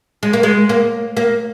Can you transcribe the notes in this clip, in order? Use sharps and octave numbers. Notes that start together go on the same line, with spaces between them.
G#3
A#3
G#3
A#3
A#3